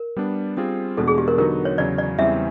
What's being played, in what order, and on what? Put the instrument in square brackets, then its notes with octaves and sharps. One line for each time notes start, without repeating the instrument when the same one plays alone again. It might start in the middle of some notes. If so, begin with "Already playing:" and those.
Already playing: [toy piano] A#4
[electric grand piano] G3 B3 D4
G3 C4 F4 G#4
[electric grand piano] E2 B2 G#3 B3 D4 [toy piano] A4
[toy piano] G#4
G4
A#4
[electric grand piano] D3 F#3 B3 D#4 F#4 [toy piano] A#4
[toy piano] C#5
[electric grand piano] E2 C#3 F#3 [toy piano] D5
[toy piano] D5
[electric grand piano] E2 C#3 E3 G3 C4 [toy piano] E5